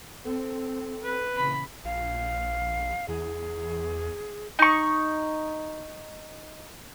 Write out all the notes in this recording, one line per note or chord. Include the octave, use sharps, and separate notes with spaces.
C4 A4
B4
A#2 C#3 E3 B5
A#1 F5
E2 G#4
D#4 C#6